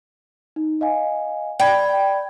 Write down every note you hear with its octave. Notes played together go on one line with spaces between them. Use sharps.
D#4
D#5 F5 G#5
D5 G5 B5 G#6